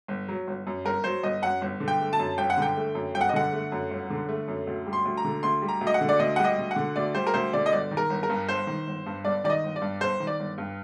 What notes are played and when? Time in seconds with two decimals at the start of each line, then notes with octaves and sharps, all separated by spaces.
0.08 G1
0.29 F#3
0.47 G1
0.67 F#2
0.85 G1 A#4
1.04 F#3 C5
1.23 G1 D#5
1.42 F#2 F#5
1.62 G1
1.80 D3
1.88 G5
2.00 A3
2.13 A5
2.19 F#2
2.38 G1 G5
2.50 F#5
2.58 D3 G5
2.76 A3
2.95 F#2
3.14 G1 G5
3.21 F#5
3.29 D#5
3.33 D3 F#5
3.52 A3
3.72 F#2
3.91 G1
4.10 D3
4.29 A3
4.48 F#2
4.67 D2
4.86 G3
4.93 C6
5.05 D2
5.17 A#5
5.25 D3
5.43 D2 C6
5.62 G3
5.68 A#5
5.81 D2
5.87 D#5
5.94 F#5
6.01 D3
6.09 D5
6.19 D2 D#5
6.36 G3 F#5
6.45 D#5
6.58 D2
6.71 F#5
6.76 D3
6.96 D2 D5
7.14 G3 C5
7.27 A#4
7.34 D2 C5
7.53 D3 D5
7.66 D#5
7.72 G1 D5
7.91 D#3
7.97 A#4
8.10 G1
8.23 A#4
8.30 G2
8.49 G1 C5
8.67 D#3
8.87 G1
9.06 G2
9.25 G1 D5
9.44 D#3 D5
9.50 D#5
9.64 G1
9.76 D5
9.82 G2
10.01 G1 C5
10.20 D#3
10.27 D5
10.40 G1
10.58 G2